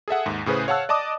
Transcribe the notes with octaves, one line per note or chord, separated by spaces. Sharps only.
G#4 A4 E5 F#5
D#2 G#2
A2 C#3 G#4 B4 C5
C#5 F5 F#5 A5 E6 F#6
D5 D#5 A5 D6 D#6